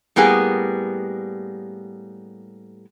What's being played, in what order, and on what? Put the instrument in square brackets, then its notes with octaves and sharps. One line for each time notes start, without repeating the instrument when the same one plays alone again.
[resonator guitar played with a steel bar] A2 G3 A#3 B3 G#4